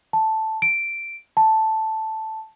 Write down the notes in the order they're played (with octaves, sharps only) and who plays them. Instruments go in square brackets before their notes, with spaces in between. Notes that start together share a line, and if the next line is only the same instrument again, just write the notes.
[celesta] A5
D7
A5